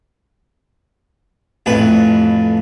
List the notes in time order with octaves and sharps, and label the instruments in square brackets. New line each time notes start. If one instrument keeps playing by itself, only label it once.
[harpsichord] A1 F2 B4